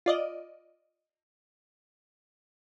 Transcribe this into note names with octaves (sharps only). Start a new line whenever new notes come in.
F4 D5 D#5